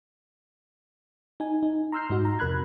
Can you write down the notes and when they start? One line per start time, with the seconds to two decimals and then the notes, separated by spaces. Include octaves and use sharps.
1.40 D#4 G#5
1.63 D#4
1.92 A#5 C6 E6 F6 G6 C7
2.10 G#2 D#4 F#4
2.25 A#5
2.39 F2 C3 A#4 B5 F#6 G#6